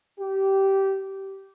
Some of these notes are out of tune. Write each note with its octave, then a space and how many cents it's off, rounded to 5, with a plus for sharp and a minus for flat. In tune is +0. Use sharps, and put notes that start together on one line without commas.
G4 -15